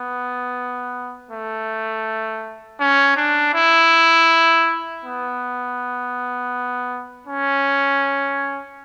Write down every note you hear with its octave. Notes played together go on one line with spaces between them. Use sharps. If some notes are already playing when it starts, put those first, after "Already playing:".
Already playing: B3
A3
C#4
D4
E4
B3
C#4